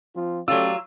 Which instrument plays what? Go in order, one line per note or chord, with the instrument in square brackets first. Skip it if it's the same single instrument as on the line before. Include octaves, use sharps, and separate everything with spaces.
[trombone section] F3 C4 F4
[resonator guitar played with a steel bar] F#3 F4 [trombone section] A3 C#4 [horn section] G4 A4 D5 [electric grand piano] E6